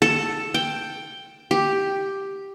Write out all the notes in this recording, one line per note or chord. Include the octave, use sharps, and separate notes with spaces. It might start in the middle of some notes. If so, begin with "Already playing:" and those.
A4
G5
G4